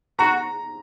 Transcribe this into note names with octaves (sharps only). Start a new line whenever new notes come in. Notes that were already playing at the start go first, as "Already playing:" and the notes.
F#4 A#5